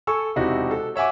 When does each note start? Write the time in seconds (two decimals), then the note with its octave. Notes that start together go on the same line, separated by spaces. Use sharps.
0.07 A4 G#5 C#6 E6
0.36 E1 C3 D#4 E4 F#4 G4
0.71 A4
0.96 C#5 E5 F#5 G#5 D6